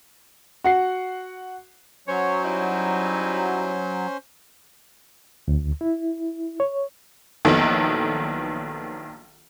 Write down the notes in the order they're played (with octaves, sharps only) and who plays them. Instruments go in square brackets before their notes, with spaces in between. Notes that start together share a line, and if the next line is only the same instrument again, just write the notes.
[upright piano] F#4 F#5 C7
[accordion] F#3 [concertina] C#4 C5 [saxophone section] C#5
[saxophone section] G3 D#4 E4
[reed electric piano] D2
E4
C#5
[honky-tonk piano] A#1 D#3 F#3 B3 E4 A4